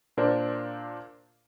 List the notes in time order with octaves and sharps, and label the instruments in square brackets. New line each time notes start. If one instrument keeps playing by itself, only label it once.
[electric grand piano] A#2 D4 A#4 C5 D5